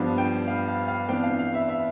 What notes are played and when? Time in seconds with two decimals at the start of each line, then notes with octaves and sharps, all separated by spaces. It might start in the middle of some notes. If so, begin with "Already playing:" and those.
Already playing: G2 F3 B3 D4
0.18 G5
0.48 F5
0.68 F5
0.88 F5
1.08 F2 E3 B3 D4 G5
1.23 F5
1.39 F5
1.54 E5
1.69 E5